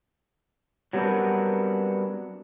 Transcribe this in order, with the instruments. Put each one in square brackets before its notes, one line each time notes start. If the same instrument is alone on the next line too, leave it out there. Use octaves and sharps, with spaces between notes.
[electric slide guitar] F#3 G3 B3 C4 D4 A#4